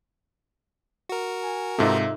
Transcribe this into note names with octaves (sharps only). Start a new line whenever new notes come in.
F#4 A#4
G#5
G#2 C3 D#4 F4 A4 E5